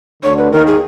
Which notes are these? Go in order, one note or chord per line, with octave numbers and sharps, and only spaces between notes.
D2 D3 C#5
B4
D#2 D#3 A#4
G#4